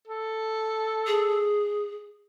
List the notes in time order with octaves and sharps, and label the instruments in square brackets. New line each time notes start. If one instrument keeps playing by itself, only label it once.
[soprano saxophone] A4
[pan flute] G#4